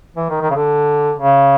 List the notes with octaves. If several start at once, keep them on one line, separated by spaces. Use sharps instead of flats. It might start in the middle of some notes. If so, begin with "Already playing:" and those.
E3
D#3
D#3
C#3
D3
C#3